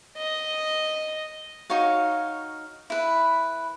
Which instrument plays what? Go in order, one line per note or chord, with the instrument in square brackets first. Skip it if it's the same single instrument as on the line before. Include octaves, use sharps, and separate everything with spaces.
[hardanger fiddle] D#5
[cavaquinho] D#4 F#4 C#5 F5
E4 B4